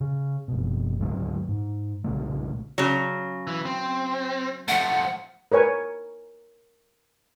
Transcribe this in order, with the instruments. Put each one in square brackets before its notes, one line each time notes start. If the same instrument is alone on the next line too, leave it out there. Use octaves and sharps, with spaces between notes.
[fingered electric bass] C#3
F#1 B2
D2 G#2 F#3 A3
G#2
B1 A#2 C#3 A3
[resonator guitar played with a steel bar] C#3 F#3
[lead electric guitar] E3
C4
[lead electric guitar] F3 A3 [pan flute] F#5
[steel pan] A#4 B4 C#5 G#5